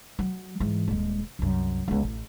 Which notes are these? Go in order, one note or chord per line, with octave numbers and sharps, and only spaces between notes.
F#3
G#2 E3
D#1 G#3
C2 F#2
C#2 B3
A1